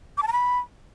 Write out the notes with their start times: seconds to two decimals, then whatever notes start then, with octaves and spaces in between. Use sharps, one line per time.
0.18 D6
0.23 A5
0.28 A#5
0.33 B5